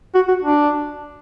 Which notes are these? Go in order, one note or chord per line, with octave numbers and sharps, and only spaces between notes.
F#4
F#4
D4